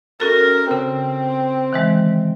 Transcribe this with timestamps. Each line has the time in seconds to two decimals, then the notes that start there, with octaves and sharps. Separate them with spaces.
0.20 C#4 F#4 A4 A#4
0.71 C#3 C4
1.73 D#3 E3 G#3